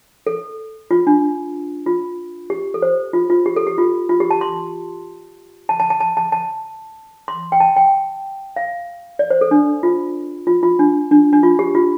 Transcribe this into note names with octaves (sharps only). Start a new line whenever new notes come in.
A4
F4
D4
F4
G4
A4
C5
F4
F4
G4
A4
G4
F4
F4
G4
A5
C6
A5
A5
A5
A5
A5
A5
C6
G5
A5
G5
F5
D5
C5
A4
D4
F4
F4
F4
D4
D4
D4
F4
G4
F4